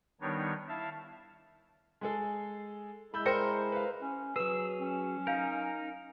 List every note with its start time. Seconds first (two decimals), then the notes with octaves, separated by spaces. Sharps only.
0.21 D#3 G3 B3 D4 D#4 C#5
0.68 E4 E5 F5 A5
2.01 G#3 G#4 A4
3.14 G#3 E4 B5 E6 G6
3.26 A#4 C5 G5 C6 C#7
3.72 B4 F5
4.02 C#4
4.36 F#3 G#4 B4 E6
4.79 C#4
5.27 D#4 A#4 F5 G6